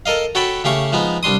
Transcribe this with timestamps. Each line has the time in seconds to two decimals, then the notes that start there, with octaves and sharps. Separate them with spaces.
0.06 A4 A#4 D#5 F5
0.35 F#4 A4 C#5 G5 A5 B5
0.64 C#3 A3 G4 F5 C#6
0.92 F3 G#3 B3 D#4
1.23 C2 G3 D4 C6 D#6